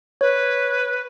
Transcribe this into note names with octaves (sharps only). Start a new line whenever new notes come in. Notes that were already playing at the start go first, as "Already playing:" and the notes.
B4 C#5